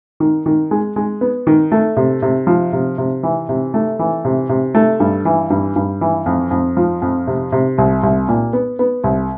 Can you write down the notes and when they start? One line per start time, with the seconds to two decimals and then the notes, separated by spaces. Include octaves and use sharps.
0.20 D#3
0.46 D#3
0.71 G#3
0.96 G#3
1.21 B3
1.47 D#3
1.72 A3
1.97 C3
2.22 C3
2.47 F3
2.73 C3
2.98 C3
3.23 E3
3.49 C3
3.74 A3
3.99 E3
4.25 C3
4.49 C3
4.75 A3
5.00 G2
5.25 E3
5.50 G2
5.76 G2
6.01 E3
6.26 F2
6.51 F2
6.77 F3
7.02 F2
7.27 C3
7.52 C3
7.78 C2
8.03 C2
8.28 A#2
8.53 B3
8.79 B3
9.04 C2